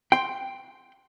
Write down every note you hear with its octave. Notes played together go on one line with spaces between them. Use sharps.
G5 C6